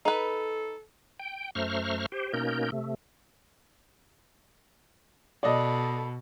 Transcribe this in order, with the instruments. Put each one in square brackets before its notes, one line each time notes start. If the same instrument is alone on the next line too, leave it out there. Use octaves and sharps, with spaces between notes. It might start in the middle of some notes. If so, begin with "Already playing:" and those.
[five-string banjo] D#4 B4 [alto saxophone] A4
[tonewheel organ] G5
F#2 A3 C5 A#5 C#6 F6
G4 C5
B2 A#3 C#4 D#4 A#4 G6
C3 A3
[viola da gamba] B2 [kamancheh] A4 B5 [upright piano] D5 D#5